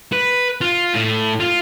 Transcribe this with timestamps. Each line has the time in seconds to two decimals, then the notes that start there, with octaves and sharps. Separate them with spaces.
0.13 B4
0.61 F4
0.94 A2
1.40 F4